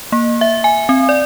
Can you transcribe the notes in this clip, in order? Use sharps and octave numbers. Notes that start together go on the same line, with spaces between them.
A#3
E5
G#5
C4
D5